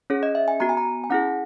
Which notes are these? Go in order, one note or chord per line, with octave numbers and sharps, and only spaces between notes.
C#4 G#4 C#5
D#5
E5
G#5
B3 F#4 A#5
G#5
A#5
G#5
C#4 E4 G#4 F#5